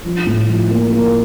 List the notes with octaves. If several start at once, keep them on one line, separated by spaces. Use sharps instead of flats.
F3
A2
F3
A#3
A#3